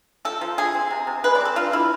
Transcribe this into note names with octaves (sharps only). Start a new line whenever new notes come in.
F3 A4
F3
D3 G#4
C4
C3
C3
G#3 B4
D5
C4 A4
D3 F4
D3 E4